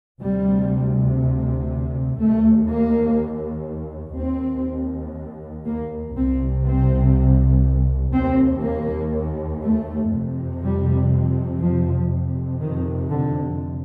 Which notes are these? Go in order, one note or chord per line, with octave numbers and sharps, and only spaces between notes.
D2 C3 G3
D#2 A3
A#3
D#2 C4
A#3
C2 C3 C4
C4
D#2 C4
A#3
A3
F2 C3
G3
F3
F2 C3
D#3
D3